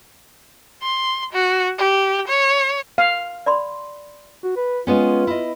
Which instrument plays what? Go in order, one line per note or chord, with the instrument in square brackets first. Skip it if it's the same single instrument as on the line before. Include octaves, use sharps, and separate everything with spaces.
[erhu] C6
F#4
G4
C#5
[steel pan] F5
[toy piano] D5 B5 C6
[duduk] F#4
B4
[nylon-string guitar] G#3 B3 C#4 [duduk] F4
[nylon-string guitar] E4 D#5